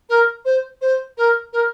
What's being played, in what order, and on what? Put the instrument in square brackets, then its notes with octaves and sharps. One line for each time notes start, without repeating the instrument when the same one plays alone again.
[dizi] A#4
C5
C5
A#4
A#4